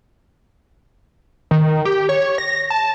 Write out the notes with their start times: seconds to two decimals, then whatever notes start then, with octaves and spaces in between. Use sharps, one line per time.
1.51 D#3
1.85 G4
2.09 C#5
2.38 A#6
2.70 A5